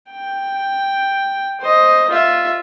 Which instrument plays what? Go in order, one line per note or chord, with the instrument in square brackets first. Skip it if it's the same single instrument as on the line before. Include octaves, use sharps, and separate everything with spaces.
[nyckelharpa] G5
C5 D#5
F4 E5